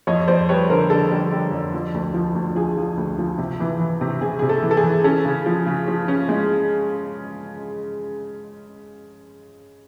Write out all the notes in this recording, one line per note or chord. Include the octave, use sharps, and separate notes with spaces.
F2 C#5 D#5
F2 C5 D5
G3 B4 C#5
D3 A#4 C5
D3 A4
G3
G3
F2
F3
D2
F3
D2
F3 G#4
F3
D2
F3
C3
E3
E3
C3
C3 G#4
C3 G#4
A4
E3
A4
G#4
E3
C#4 A4
C#3
F3
C#3
F3
C#4
G#3